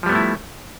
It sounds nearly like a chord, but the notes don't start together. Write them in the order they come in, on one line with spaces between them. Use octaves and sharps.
F3 G3 B3 A3 E4